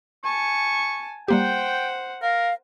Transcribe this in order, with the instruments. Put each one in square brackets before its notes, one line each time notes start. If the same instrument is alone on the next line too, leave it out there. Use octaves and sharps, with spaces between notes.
[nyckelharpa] G#5 A5 [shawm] C#6
[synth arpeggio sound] G3 A#3 G4 [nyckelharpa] C5 F#5 [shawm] G5
[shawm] A#4 [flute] F5